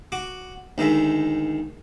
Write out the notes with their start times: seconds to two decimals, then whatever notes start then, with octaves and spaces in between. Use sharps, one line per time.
0.12 F#4 D6
0.78 D2 D#3 G#3 E5